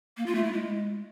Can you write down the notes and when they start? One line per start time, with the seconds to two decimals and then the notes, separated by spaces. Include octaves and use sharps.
0.17 A#3
0.26 F4
0.35 A3
0.44 E4
0.53 G#3